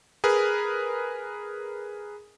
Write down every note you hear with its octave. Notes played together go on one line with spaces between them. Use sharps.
G#4 A#4 B4